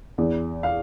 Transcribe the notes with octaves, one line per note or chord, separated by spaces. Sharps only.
E2
F5